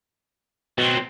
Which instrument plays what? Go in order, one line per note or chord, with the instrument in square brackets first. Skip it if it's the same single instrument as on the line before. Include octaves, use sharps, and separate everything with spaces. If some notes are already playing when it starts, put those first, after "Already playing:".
[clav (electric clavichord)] B2 [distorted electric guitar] F#3 C4